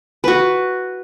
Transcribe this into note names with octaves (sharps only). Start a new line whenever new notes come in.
F#4 B4